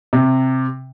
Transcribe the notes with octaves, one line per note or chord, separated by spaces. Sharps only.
C3